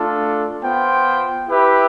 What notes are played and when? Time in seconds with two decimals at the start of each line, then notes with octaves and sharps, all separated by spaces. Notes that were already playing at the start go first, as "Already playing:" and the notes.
Already playing: A3 D4 F4 A4
0.63 B3 F4 C5 G5
1.47 E4 G4 B4 E5